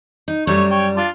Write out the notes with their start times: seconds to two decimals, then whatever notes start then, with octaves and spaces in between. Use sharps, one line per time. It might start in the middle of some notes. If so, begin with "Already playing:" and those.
0.28 D#4
0.47 F#2 G3 A3 C#5
0.71 C#5 G5
0.97 D4 F4